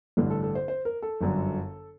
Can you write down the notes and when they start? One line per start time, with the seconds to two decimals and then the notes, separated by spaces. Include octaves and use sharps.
0.17 A1 G2 D3
0.30 A4
0.43 A4
0.55 C5
0.68 C5
0.85 A#4
1.02 A4
1.21 G1 F#2 D3